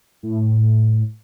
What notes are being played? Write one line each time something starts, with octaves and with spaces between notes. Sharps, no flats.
A2